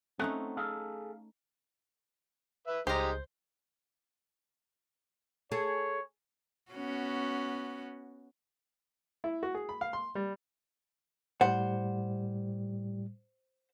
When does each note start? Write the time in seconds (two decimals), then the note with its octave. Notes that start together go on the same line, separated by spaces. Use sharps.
0.19 A3 C4 C#4 D#4 F#5
0.57 G#4 A4 F5
2.67 B4 E5
2.87 C#2 G3 G#3 D#4 G4 C5 A#5 G6
5.52 G#4 A4 C#5
6.72 B3 C#4 F#4
9.24 E4
9.43 F#4
9.55 G#4
9.69 B5
9.81 F5
9.93 C6
10.15 G3
11.41 A2 G3 C5 F#5